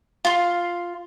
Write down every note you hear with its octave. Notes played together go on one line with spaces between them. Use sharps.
F4 C6